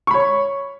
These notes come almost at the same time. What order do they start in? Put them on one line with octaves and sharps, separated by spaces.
C#6 B5 C#5